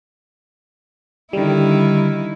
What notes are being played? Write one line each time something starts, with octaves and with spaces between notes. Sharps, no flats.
D3 D#3 G3 E4